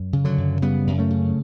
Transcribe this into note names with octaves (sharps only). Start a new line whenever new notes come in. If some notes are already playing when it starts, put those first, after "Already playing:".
Already playing: F#2
C#3
D3 F#3
F#2
C#3 G3 B3
F#2
A3 C#4
C#3